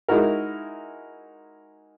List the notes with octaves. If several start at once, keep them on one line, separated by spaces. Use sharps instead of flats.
G#3 D#4 E4 F#4 A#4